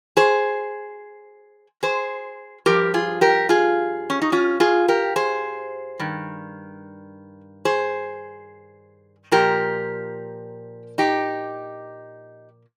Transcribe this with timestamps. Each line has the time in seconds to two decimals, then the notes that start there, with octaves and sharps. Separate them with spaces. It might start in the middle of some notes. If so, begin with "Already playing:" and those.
0.17 G#4 C5
1.83 G#4 C5
2.66 G2 F3 G4 A#4
2.94 F4 G#4
3.21 G4 A#4
3.49 F4 G#4
4.10 C#4
4.22 D#4
4.32 C#4 F4
4.60 F4 G#4
4.88 G4 A#4
5.16 G#4 C5
5.99 G2 D#3
7.65 G#4 C5
9.31 A#2 F3 G4 A#4
10.98 D#4 G4